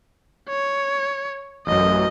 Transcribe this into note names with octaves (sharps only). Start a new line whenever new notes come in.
C#5
A1 F#2 D#5